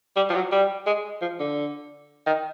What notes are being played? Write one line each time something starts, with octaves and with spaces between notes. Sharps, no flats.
G3
F3
F#3
G3
G#3
F3
D3
D#3